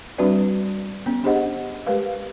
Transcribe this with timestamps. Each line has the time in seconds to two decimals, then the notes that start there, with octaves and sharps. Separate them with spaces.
0.18 G3 C4 D4 F#4 B4 D5
1.06 B3 C#4
1.24 D4 G4 G#4 C5 D#5 F#5
1.87 G#3 G4 A#4 B4 F5